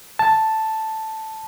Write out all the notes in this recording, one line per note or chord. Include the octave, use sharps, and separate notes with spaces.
A5